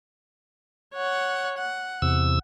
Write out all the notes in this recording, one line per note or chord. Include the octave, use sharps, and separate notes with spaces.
C#5 F#5
F#5
E2 C3 E6